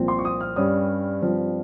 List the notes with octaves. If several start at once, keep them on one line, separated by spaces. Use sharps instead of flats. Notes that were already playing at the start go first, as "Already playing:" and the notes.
Already playing: C2 A#2 F3 C4
C6
C#6
D#6
F6
G2 G3 C#4 D#6
G2 F3 C4